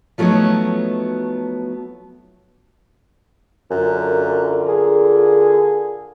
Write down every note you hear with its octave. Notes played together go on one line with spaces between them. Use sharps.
F3 F#3 A3 B3 D#4 C#5
F#2 D3 F4 A#4
G#4